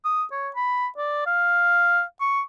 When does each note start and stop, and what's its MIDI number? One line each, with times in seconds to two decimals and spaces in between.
0.05 0.23 87
0.32 0.49 73
0.56 0.87 83
0.98 1.23 74
1.27 2.02 77
2.21 2.41 85